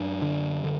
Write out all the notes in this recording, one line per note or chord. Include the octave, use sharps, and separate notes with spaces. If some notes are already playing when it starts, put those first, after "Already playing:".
Already playing: F#2 D4
D3
D3